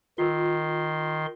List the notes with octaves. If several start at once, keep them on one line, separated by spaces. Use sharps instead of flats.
D#3 F4 A#4 C6